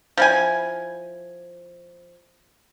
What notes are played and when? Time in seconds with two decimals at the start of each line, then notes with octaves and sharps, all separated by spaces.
0.17 F3 E4 G#5